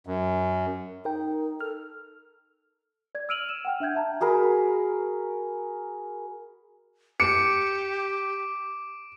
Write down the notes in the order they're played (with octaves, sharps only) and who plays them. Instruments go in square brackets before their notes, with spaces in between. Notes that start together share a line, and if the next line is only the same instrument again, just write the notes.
[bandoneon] F#2
[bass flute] D#4 [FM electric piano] A#4 G5
[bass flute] A4 [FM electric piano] F6
[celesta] D5 G#6
E6 F6 D7 D#7 F7 F#7
E7
F#5 G5 F6
D4 E5 G5 G6 G#6
E5 A5 A#5
[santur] F#4 G#4 A#4 B4
[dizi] G4 [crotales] D6 D7 [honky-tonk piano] C#7